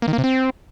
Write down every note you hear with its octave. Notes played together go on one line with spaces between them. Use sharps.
A#3
D#3
A#3
C3
C4